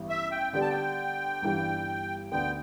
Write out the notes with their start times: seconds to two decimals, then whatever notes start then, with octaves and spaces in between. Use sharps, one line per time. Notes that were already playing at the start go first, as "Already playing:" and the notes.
Already playing: A1 G2 E3 B3
0.09 E5
0.32 G5
0.53 D3 G3 B3 G4 D5 G5
0.61 A5
0.69 G5
1.42 G1 G2 E3 G3 D4
2.31 D2 D3 B3 G5